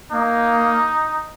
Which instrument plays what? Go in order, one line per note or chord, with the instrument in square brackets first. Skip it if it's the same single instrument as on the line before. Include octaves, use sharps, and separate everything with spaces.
[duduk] A#3 [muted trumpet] D#4